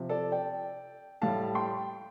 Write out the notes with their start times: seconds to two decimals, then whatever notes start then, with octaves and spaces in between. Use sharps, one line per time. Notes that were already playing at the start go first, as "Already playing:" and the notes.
Already playing: C3 F3
0.09 A4 D5
0.32 D5 G5
1.22 A2 G3 F5 A5
1.55 G5 C6